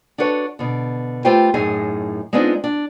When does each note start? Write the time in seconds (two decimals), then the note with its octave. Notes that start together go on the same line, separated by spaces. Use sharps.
0.18 D4 F#4 A4 B4 C#5
0.59 B2 D3
1.25 A3 F4 G4 B4 C5 G5
1.54 F#2 A2 D#4 G#4
2.33 G#3 B3 C4 D4 D#4 F4
2.64 D4